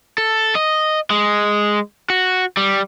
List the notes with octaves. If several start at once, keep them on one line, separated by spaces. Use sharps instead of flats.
A4
D#5
G#3
F#4
G3